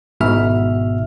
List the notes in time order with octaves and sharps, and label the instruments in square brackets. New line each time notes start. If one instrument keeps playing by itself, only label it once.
[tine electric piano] G#1 G#2 B2 E5 F6